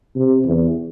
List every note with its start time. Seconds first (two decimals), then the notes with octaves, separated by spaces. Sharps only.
0.16 C3
0.45 E2